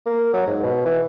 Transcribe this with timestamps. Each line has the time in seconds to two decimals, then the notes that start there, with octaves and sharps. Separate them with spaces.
0.06 A#3
0.33 F#3
0.47 G#2
0.63 B2
0.85 E3